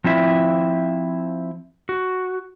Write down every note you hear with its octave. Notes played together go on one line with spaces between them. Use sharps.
F3 C4 E4 E5
F#4